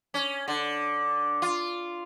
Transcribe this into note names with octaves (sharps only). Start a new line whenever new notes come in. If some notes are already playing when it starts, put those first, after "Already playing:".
C#4
D3
F4